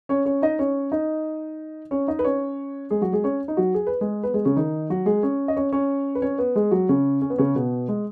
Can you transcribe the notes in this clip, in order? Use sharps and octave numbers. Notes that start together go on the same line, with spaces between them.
C#4 C#5
C#4 C#5
D#4 D#5
C#4 C#5
D#4 D#5
C#4 C#5
D#4 D#5
B4
C#4 C#5
G#3 G#4
F#3 F#4
G#3 G#4
C#4 C#5
D#4
F#3 F#4
G#4
B4
G#3 G#4
B3 B4
G#3 G#4
C#3 C#4
D#3 D#4
F#3 F#4
G#3 G#4
C#4 C#5
D#5
C#4 C#5
C#4 C#5
B4
C#4 C#5
B3 B4
G#3 G#4
F#3 F#4
C#3 C#4
C#4
B3
C#3 C#4
B2 B3
G#3